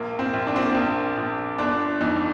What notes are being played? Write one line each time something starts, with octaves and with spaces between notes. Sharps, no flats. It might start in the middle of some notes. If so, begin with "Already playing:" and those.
Already playing: A#1 A#3
C4
A#1
D4
C4
A#3
A#1 C4
A#1
G1 D4
F2 D#4